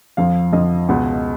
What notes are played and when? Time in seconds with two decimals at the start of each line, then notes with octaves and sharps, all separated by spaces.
0.17 F2 F3 F5
0.53 F2 F3 D#5
0.89 C#2 B2